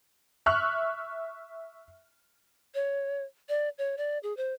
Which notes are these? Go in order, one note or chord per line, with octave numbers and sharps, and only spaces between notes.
E5 C#6 F6 F#6
C#5
D5
C#5
D5
G#4
C5